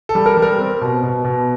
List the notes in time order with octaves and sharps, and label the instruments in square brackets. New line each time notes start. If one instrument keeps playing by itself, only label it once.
[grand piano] A4
G3
A#4
G3
A#4
C4
B2
B2
B2